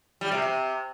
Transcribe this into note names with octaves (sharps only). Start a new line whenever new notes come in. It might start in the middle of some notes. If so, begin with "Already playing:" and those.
G3
C3
C3